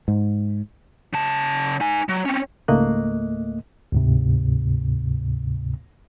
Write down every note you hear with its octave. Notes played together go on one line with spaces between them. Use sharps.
G#2
C#3 A5
D#4 G#5
F#3
C4 C#4
C#2 G#2 A3 A#3 D#5 F#6
D2 G#2 C3